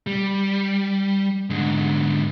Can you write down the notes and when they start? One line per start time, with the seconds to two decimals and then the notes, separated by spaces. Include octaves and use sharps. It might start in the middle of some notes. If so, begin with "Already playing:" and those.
0.07 G3
1.50 G#2 D3